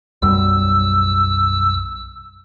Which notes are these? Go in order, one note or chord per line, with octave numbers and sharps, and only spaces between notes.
B1 F#2 G3 E6